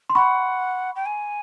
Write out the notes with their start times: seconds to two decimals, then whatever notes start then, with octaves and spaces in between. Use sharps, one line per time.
0.10 C6
0.15 F#5 B5 C#6
0.95 G5
1.05 G#5